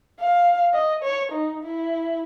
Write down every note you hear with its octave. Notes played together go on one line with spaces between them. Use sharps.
F5
D#5
C#5
D#4
E4